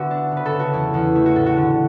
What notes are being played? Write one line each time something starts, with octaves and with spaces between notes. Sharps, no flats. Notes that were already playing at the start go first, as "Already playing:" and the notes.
Already playing: D3 B3 F#4 D5 E5 F#5
D4
C#3 B4
A4
C#3
F#4
E2 E4
E2
A3 E4
F#4
A2 A4
F#4
D3